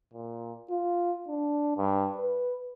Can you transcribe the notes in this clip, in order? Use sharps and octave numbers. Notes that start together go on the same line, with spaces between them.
A#2
F4
D4
G2
B4